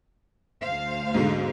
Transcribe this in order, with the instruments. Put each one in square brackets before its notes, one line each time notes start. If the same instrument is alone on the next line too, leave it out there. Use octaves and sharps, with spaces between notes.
[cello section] D2 C5 F5
[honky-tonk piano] G#2 B2 D3